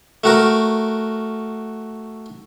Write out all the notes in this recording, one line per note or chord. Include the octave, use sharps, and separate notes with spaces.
A3 F#4 A#4